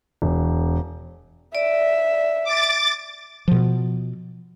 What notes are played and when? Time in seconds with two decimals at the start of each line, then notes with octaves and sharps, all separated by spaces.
0.22 E1
1.55 D5 E5
2.44 D6 A6
3.48 B2 F3